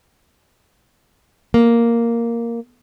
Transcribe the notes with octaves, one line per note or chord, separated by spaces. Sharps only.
A#3